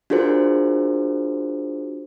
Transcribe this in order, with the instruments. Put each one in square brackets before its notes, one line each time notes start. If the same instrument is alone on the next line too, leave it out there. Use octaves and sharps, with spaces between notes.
[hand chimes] D4 F4 F#4 G#4 A#4 C5